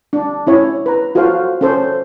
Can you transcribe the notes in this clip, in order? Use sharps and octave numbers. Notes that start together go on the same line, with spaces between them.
D4
C#4 E4 C#5
B4 A#5
F4 F#4 A4 C5 F5
C#4 A4 C5 C#5